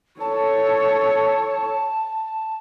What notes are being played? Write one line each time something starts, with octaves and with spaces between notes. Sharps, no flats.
A4 C#5 A5